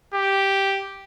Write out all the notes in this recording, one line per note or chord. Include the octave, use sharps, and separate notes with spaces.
G4